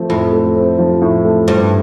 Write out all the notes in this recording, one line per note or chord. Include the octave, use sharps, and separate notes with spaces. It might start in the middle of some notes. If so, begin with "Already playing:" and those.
Already playing: F3 A3 C4
F2 A2
A3
C4
F3
A2
A3
G2 C4